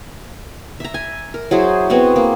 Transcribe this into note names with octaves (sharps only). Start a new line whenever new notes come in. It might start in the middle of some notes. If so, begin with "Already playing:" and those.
E5 A#5
G#5
A#4
F#3 E4 G#4 C5
B3 C4 F#4 G#4
A#3